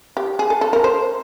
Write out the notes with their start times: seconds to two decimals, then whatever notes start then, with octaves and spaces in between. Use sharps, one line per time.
0.17 G4
0.39 G#4
0.50 A4
0.61 A4
0.73 A#4
0.84 C5